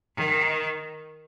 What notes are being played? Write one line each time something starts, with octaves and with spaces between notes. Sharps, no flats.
D#3